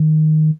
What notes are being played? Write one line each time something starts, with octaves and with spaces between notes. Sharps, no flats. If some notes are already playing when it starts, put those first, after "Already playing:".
Already playing: D#3